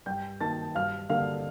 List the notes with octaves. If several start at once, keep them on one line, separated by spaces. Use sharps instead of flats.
G2 G5 G6
D#3 A#3 A5 A6
G2 F5 F6
D3 G3 A#3 F5 F6